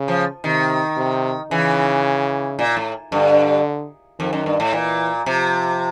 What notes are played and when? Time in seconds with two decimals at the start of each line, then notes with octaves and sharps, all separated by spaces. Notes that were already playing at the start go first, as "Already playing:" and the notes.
Already playing: C#3
0.08 F3
0.44 C3 D#3
0.97 C3
1.51 C#3 E3
2.59 A#2
2.77 A2
3.12 G2 D3
4.19 F2 D#3
4.33 F#2
4.46 G2
4.60 A2
4.73 A#2 E3
5.26 C3 F3